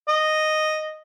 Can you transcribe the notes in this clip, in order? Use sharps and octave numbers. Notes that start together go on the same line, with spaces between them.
D#5